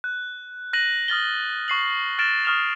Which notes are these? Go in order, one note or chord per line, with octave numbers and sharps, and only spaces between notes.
F#6
F#6 A#6 D#7 F#7
D#6 F6 A6 G7
C#6 C7 F#7
F6 A6 D7 E7
C#6 D#6 F6 A6 E7 F7